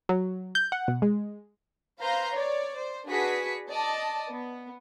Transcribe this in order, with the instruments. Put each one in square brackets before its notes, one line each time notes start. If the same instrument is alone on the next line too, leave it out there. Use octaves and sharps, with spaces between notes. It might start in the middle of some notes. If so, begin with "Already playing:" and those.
[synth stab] F#3
G6
F#5
B2
G#3
[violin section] B4 C5 F5 A#5 C6 G6
C#5 D5
C5
D4 F#4 G#4 B4 B6 C#7
D5 D#5 A5
B3